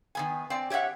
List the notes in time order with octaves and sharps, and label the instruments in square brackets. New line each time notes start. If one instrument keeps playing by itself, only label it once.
[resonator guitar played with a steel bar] D#3 B3 G#5
C4 D5
G4 C#5 D#5 E5 F#5